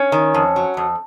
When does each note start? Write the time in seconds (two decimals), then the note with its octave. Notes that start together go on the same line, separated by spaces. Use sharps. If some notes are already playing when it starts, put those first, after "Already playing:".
Already playing: C#4
0.12 D#3
0.35 F2
0.56 F#3
0.77 F2